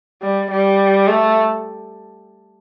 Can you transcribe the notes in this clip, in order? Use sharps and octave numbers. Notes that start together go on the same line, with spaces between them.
G3
G3
A3